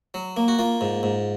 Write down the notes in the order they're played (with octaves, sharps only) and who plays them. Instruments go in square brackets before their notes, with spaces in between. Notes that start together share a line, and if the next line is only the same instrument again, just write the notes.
[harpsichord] F#3
A#3
F#4
A#3 F4
G#2
G#2